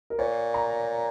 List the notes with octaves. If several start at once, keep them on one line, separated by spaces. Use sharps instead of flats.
A#4
A#2 C#5
A#5